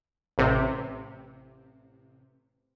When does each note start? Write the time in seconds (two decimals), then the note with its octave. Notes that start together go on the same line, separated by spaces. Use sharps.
0.38 A1 C3